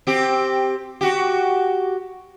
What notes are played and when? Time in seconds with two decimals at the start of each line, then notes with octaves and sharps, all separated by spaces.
0.07 C4 G4
1.01 F#4 G4